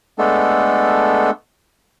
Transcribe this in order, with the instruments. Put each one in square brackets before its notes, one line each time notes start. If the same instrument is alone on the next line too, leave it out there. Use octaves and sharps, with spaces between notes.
[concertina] G#3 A3 B3 D4 A4